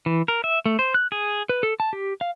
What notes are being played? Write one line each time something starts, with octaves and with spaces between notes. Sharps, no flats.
E3
A#4
E5
A3
C5
F#6
G#4
B4
A4
A5
G4
F5